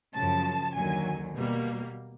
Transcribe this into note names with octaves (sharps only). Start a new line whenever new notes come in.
F#2 C#3 F3 A5
D#2 D3 F#3 G#5
B2 G3 A#3